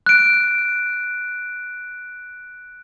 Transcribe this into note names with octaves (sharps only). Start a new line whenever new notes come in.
F#6 D7